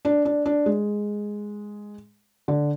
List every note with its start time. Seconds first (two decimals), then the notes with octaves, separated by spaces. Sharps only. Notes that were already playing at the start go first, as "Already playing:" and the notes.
0.05 D4
0.25 D4
0.46 D4
0.66 G#3
2.48 D3